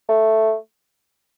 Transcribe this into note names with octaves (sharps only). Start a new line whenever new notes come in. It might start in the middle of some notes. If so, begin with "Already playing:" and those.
A3